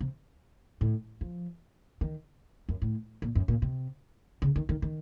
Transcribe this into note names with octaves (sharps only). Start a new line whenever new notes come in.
C3
A2
F3
D#3
F#2
A2
A#2
F#2
A#2
C3
C#3
D#3
D#3
D#3